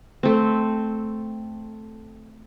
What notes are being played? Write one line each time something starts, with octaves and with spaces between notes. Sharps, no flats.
A3 C4